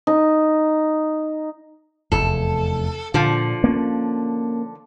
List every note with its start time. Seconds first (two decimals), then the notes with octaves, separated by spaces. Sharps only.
0.07 D#4
2.12 F1 E2 A4
3.14 A#2 D3 F3
3.64 A#3 C#4